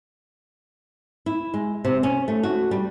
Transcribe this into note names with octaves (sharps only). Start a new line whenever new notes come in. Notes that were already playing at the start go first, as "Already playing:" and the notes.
E4
G#3
C3
C#4
A3
F#4
G3